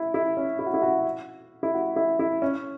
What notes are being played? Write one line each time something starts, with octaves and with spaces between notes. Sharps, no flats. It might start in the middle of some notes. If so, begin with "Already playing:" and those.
Already playing: E4
E4
C#4
E4
F#4
E4
F#4
E4
F#4
E4
E4
C#4